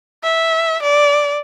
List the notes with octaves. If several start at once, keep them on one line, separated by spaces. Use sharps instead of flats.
E5
D5